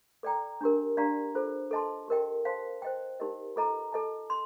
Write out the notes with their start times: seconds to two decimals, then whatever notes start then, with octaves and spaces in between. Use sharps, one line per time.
0.23 A4 D5 G5 A#5
0.61 D4 G4 A#4
0.97 D4 G4 D5 F5 A#5
1.35 F4 A4 C5
1.71 A4 D#5 A5 C6
2.08 G4 A#4 D#5 G5
2.45 C5 F5 A5 C6
2.82 C5 D#5 G5
3.20 D#4 G4 A#4 D#5
3.56 F4 A4 D#5 A#5
3.92 A4 D#5 A5
4.30 C6